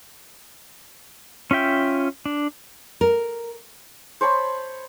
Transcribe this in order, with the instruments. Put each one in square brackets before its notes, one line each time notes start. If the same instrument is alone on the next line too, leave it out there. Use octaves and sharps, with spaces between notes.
[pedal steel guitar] C#4 F4 E5 G5
D4
[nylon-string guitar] A#4
[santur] C5 C#5 A5 B5